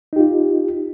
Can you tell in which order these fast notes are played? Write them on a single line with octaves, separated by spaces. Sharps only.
D#4 G4 F4